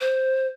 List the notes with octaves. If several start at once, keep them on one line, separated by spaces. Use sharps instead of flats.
C5